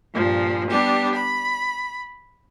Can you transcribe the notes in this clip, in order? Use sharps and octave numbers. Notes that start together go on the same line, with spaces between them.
G2 A#2 F3
G3 B3 D4 G4
B5